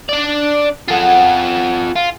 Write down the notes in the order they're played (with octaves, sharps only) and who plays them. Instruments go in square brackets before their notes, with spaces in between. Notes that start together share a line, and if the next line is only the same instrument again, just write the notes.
[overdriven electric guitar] D4 D5 [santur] D#6
[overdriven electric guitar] F4 A4 [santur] G#4 F#5 D#6
[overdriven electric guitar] F4